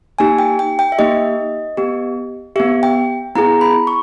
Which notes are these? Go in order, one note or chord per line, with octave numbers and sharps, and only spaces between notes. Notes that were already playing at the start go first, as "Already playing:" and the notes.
A#3 D#4 G4 G#5
G5
G5
G5
E5
A#3 D#4 G4 D#5
B3 G4
B3 G4 E5
G5
B3 E4 G#4 A#5
B5
C#6